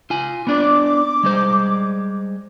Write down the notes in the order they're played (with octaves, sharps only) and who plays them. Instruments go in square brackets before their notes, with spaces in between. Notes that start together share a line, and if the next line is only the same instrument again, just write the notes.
[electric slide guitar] F4 G#5
[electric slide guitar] B3 D4 D5 [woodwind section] D6
[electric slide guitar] G3 G#3 C5